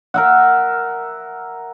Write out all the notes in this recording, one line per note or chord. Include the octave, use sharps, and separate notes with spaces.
A#4 E5 F#5